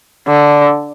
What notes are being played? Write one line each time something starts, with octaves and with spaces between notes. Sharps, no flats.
D3